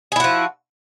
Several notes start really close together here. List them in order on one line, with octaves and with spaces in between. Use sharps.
G#4 E4 F#4 F3